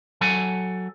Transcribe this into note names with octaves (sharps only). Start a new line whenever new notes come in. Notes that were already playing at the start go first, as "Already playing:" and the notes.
F#3 A4 G#5